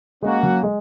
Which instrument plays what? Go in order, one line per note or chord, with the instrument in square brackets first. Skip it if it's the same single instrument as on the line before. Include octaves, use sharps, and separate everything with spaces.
[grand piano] G#3 [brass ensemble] A#3 C#4 F#4
[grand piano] F#3
G#3